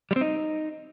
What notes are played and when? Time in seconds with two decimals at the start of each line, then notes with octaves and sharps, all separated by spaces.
0.11 G3
0.16 C4
0.21 D#4